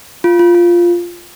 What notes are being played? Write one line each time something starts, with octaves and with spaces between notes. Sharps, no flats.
F4
F4
F4